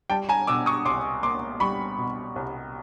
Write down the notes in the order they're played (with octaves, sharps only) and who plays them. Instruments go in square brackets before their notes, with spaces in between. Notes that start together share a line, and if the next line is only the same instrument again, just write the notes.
[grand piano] G3 G5 A5
G#5 A#5
B2 D6 E6
C#6 D#6
C2 C6 D6
A#3 C6 D6
G3 B5 C#6
B2
C2